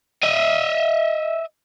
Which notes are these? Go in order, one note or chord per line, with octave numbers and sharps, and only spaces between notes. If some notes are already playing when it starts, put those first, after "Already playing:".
D#5 E5